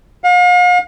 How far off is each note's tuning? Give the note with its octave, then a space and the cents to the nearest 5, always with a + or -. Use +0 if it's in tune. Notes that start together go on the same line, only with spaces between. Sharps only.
F5 +45